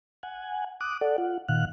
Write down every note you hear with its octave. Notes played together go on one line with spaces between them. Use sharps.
F#5 G#5
D6 D#6 F#6
A4 D5 F#5
F4 F#5
A#2 D#3 F5 F#5 F#6